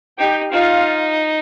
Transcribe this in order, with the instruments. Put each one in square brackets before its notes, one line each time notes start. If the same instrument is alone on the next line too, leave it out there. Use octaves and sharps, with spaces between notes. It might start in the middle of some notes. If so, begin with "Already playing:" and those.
[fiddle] D#4 [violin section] G4 G5
[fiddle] D#4 [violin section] F4 F5